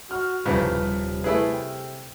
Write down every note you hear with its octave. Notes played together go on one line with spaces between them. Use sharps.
F#4 F6
D#1 C2 G2 C#3 F3 B4
C3
A3 E4 G#4 A4 B4
G5